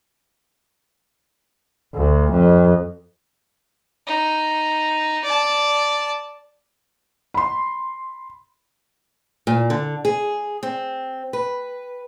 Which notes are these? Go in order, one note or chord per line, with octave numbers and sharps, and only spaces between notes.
D2
F2
D#4
D5 A5
B5 C6
A#2
D3
G#4
C4
B4